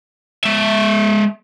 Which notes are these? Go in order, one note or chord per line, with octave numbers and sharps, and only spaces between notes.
G#3 E5